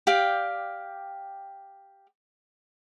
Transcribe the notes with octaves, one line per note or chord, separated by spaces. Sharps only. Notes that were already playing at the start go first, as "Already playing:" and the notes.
G4 D5 F5 G5